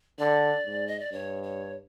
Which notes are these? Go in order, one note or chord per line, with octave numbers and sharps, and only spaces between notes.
D3 D5
G#2
D#5
D5
G2 C#5
C#5